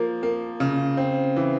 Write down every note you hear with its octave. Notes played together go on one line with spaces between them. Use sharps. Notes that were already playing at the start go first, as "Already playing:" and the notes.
Already playing: F3 A#3
A#3
C#3
C4
E3